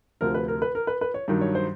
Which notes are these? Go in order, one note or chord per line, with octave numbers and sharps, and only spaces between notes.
D2 C3 F3 A#4
B4
A#4
B4
A#4
B4
B4
C#5
G2 D#3 F#3
C#5
C5